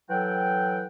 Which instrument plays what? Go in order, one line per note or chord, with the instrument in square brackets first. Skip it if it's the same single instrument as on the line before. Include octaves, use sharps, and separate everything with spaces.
[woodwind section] E3 F#3 A4 F#5 G5